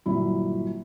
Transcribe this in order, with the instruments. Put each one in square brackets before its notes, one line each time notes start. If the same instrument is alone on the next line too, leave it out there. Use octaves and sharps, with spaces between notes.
[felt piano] G1 A#2 F#3 E4